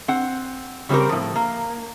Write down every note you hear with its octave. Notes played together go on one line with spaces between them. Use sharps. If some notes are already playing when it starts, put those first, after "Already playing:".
C4 F#5
C#3 G3 C4 G4 A#4
A2 F3
A#3